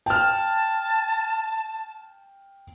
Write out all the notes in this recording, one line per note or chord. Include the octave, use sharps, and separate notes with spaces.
G5 A5 F6